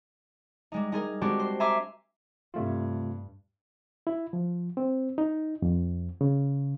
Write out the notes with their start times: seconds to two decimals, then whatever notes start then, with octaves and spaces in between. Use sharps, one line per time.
0.72 G3 G#3 D#4
0.92 D#4 G#4 A#4
1.22 G#3 C4 D4 F#4 G4
1.39 C5
1.60 E5 G#5 A#5 C6 D6
2.54 G2 C3 A3 F4
4.07 E4
4.33 F3
4.77 C4
5.18 D#4
5.62 F2
6.21 C#3